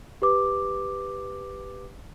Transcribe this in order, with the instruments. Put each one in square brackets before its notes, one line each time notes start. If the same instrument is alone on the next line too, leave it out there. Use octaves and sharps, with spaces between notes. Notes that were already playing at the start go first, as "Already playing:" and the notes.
[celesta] G4 B4 D6